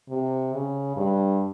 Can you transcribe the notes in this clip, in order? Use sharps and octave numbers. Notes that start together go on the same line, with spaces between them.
C3
C#3
G2